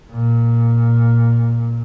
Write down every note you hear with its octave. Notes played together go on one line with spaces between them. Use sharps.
A#2